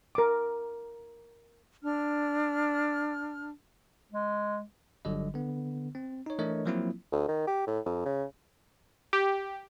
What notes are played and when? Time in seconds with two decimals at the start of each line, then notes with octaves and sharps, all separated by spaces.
0.15 A#4 D6
1.83 D4 F6
4.12 G#3
5.05 G1 D3 F#3 G3 D#5
5.34 D3 B3
5.95 C4
6.26 D#4 C#5
6.39 E3 A3 D4 A#4 C#5 D#5
6.66 F3 F#3 A#3 C4 E4 F4
7.12 D2
7.28 D#3
7.47 G4
7.67 A2
7.86 F2
8.06 C#3
9.13 G4